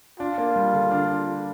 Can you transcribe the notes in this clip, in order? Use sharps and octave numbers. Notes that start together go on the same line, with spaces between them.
D4 F4
A#3
G3
D3
D4